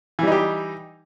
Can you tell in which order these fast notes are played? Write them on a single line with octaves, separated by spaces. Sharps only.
E3 G3 D#4 G4